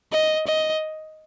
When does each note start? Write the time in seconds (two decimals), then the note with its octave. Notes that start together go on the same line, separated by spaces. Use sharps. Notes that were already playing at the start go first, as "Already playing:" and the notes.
0.13 D#5
0.47 D#5